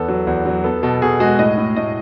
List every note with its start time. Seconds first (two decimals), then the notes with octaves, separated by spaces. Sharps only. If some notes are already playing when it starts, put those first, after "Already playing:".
Already playing: E2 B3 A4
0.08 F#3
0.27 E2
0.46 F#3
0.64 B3 A4
0.83 B2 A4
1.02 B2 G#4
1.20 G#3 F#4
1.39 A2 D#5
1.58 A2
1.76 A2 D#5